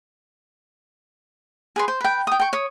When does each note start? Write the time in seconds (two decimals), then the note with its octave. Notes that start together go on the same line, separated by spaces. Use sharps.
1.76 G#4 B4 C6
1.88 C5
2.01 B4 G5
2.27 G5 D#6
2.40 G5 C#6
2.53 C#5 D#6